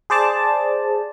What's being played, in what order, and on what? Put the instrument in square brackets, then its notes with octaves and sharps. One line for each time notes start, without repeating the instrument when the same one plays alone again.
[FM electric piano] G#4 C5 D5 A5